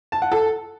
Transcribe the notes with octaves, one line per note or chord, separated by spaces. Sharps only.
A5
F#5
A4